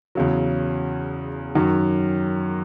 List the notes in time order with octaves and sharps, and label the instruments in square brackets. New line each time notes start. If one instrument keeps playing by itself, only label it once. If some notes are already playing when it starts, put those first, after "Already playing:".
[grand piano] E2 C#3 F#3
F#2 D#3 F#3